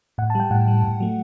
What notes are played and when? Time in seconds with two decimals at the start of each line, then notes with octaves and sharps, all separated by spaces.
0.18 A2 F#5
0.30 A5
0.35 G3 G5
0.50 A2 F#5
0.68 G3
0.84 A2
1.00 F#3 A3